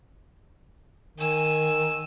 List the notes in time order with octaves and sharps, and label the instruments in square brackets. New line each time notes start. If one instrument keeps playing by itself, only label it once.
[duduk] D#3 [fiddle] G#5 E6